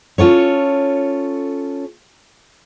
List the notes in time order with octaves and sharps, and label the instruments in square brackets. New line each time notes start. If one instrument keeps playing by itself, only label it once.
[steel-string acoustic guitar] C#4 F4 A4 C#5